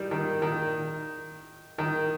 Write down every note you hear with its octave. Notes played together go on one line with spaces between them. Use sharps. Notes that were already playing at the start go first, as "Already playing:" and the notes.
Already playing: D#3 G3
D#3
D#3
D#3